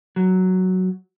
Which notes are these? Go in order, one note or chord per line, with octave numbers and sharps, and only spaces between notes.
F#3